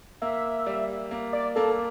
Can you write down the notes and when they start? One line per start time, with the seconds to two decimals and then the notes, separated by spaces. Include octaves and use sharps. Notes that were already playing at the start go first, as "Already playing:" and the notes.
0.22 A#3 E5
0.66 G3
1.11 A#3
1.33 D5
1.56 A#3 A4